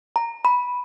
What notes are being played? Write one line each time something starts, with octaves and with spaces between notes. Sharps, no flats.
A#5
B5